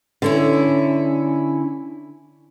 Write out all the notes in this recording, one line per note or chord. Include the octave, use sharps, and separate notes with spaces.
D3 C#4 E4